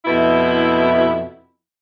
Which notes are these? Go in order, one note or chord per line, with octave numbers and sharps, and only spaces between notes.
F2 B2 E4